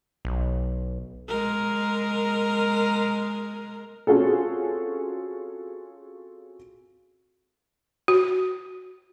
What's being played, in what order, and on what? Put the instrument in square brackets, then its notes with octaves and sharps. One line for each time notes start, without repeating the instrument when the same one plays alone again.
[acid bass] B1
[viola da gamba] G#3 A#4
[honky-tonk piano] C4 C#4 F4 F#4 G#4 A4
[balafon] F#4